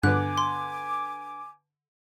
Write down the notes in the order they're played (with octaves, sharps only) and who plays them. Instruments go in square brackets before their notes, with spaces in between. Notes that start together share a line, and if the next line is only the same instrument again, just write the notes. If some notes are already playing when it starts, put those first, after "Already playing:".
[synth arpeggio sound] G2 [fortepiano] D3 B3 [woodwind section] G#5 D6 [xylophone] F#6
[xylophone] C6